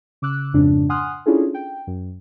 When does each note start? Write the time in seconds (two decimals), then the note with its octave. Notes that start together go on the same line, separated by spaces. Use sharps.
0.22 C#3 D6 E6 F#6
0.54 F2 G#2 C#3 D4
0.89 F#5 G#5 C6 D#6 F6 F#6
1.26 C#4 D4 E4 F4 G#4 A4
1.54 G5
1.87 F#2